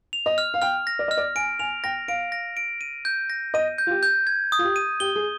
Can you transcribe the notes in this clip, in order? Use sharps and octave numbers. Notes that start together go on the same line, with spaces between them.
F7
D#5
F6
F5
G5 F6
A#6
D5
D#5 F6
D5
G#5 D7
G#5 F7
G5 A#6
F5 D7
A#6
D7
D#7
G6
A#6
D#5 D#7
G6
F4
G4
G6
G#6
D#6
F4
G4
D#7
G4 G7
G#4